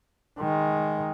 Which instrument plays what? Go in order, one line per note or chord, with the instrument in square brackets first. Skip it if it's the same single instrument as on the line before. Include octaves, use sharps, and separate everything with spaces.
[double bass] D#3 G#3